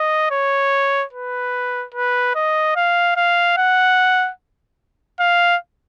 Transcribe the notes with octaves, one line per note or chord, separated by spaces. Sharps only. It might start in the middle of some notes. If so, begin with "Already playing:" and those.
Already playing: D#5
C#5
B4
B4
D#5
F5
F5
F#5
F5